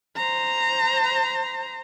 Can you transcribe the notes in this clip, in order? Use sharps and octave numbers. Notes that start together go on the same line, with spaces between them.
C5 A#5